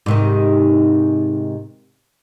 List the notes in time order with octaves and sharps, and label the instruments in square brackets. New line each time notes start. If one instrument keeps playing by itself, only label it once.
[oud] G#2 C3 D#3